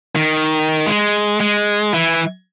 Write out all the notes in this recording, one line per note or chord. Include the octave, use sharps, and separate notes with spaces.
D#3
G#3
G#3
E3